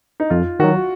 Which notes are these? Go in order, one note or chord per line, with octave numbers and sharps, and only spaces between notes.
D#4
F2 F4
D#3 F#3 F#4